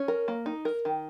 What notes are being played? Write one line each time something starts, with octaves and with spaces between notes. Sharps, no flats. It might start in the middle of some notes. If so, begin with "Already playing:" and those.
Already playing: C#4
A#4
A#3
D#4
A#4
D#3